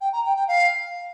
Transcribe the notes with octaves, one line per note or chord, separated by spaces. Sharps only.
G5
A#5
G5
G5
F5